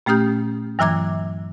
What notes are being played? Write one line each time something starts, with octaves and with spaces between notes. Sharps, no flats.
A#2 A3 C#4 G4 D#6 G6
G2 E3 F#3 A#5 D6 G#6